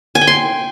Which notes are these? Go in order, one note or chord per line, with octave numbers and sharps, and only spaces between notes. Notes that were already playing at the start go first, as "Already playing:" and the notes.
G#5
G5
C6